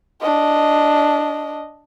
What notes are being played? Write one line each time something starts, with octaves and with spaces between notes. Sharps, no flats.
D4 D#5